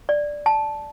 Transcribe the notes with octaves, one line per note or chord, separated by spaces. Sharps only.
D5
A5